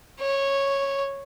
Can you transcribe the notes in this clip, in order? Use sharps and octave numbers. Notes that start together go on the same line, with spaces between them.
C#5